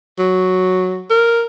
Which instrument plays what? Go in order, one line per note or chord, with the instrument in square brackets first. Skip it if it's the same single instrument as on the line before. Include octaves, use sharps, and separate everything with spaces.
[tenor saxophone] F#3
A#4